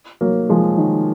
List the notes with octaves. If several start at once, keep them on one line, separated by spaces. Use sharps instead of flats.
F#3 A#3
F3 G#3
D#3